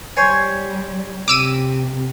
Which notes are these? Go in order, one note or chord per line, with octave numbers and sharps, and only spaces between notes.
G3 C5 C#5 G#5
C3 D6 E6 D#7